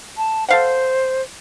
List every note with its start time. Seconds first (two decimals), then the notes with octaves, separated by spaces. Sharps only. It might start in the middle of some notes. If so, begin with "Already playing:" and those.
0.17 A5
0.49 A4 C5 F5 F#5